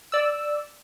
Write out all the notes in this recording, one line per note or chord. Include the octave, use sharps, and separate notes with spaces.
D5 E6